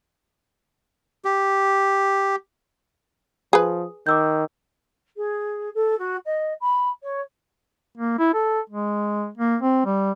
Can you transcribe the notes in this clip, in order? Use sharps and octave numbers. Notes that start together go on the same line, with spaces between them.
G4
F3 G#4 B4 D#6
D#3 D6 E6 G6
G#4
A4
F#4
D#5
B5
C#5
A#3
E4
A4
G#3
A#3
C4
G3